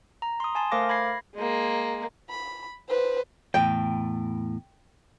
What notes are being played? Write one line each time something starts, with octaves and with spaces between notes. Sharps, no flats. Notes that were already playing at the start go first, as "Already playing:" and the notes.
A#5
C6 D#6
G#5 A5 C6
A3 A#4 C5 F5 D6 A#6
B5 G#6 A#6 C7
G#3 A#3
B5
B4 C5
E2 A2 G5